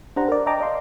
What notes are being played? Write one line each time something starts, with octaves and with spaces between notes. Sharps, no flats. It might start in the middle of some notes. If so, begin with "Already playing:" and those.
D4 G4 C5 F#5 A#5
A#4 D5
D5 D#5 G5 A5 A#5 D6
D5 D#5 F5 C6